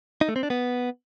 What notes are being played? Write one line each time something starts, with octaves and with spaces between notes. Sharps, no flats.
D#4
A3
C4
D4
B3